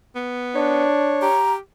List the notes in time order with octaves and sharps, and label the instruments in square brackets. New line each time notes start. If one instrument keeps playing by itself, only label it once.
[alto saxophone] B3
[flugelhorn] D4 [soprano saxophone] C#5
[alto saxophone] G4 [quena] A#5